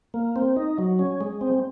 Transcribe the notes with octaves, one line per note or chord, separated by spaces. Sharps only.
A#3
C4
D#4
F#3
C#4
G#3
C4